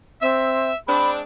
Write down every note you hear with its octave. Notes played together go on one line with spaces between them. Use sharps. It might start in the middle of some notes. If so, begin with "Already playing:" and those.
C4 E5
G#3 C4 D4 B5